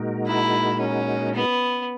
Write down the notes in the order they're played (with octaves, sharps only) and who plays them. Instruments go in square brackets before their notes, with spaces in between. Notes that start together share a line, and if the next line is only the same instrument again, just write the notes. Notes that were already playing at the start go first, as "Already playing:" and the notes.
Already playing: [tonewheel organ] A#2 G#3 D#4 F#4 A#4
[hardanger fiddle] E4
C#4
B3